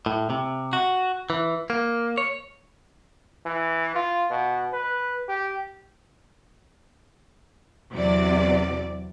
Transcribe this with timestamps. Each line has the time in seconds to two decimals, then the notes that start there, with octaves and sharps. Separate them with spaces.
0.06 A2
0.30 C3
0.73 F#4
1.30 E3
1.70 A#3
2.18 C#5
3.46 E3
3.96 F4
4.31 B2
4.73 B4
5.29 G4
7.91 E2 C3 F#3 D5